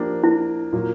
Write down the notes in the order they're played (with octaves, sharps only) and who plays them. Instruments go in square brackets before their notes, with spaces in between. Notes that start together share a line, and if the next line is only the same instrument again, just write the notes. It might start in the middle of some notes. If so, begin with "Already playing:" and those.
Already playing: [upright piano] F3 A#3 D4 G4
[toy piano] E4
[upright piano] A#2 F#3 A#3